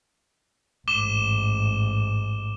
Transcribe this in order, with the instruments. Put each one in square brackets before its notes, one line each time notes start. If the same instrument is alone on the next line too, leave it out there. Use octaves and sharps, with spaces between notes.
[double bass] A1 G#2 [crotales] D6 E7 G7